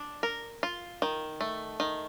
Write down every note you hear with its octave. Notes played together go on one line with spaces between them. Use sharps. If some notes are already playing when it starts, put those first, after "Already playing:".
Already playing: D4
A#4
F4
D#3
A3
D#3